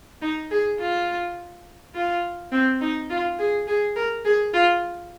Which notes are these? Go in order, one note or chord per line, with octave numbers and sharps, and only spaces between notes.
D#4
G#4
F4
F4
C4
D#4
F4
G#4
G#4
A#4
G#4
F4